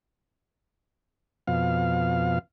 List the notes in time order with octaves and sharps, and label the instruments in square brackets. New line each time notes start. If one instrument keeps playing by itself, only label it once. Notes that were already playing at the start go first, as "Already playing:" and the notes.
[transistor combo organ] F2 B2 F5